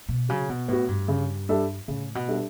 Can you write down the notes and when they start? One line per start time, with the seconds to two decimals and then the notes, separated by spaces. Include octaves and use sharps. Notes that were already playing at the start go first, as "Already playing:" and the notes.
0.09 B2
0.29 C#3 F#3
0.49 B2
0.68 A2 B3 F#4
0.88 G2
1.08 C#3
1.49 G3 D4 A4 E5
1.88 A2 C#3
2.15 B2
2.28 G3 D4 A4 E5